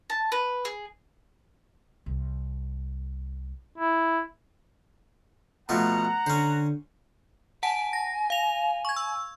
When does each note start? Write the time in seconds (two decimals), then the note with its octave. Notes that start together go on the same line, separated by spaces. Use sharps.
0.10 A5
0.32 B4
0.65 G#4
2.06 C2
3.78 E4
5.69 B2 F3 A3 F#5 A#5
6.26 D3 C#4 C5
7.63 F#5 G#5 A5 D7
7.93 A#6
8.30 F5 F7
8.85 C#6 G#6
8.96 E6